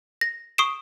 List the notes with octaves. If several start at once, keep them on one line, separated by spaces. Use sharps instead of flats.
A#6
C#6 D#6 C7 D7 E7